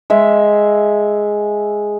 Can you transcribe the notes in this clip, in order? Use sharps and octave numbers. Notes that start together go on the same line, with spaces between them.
G#3 E5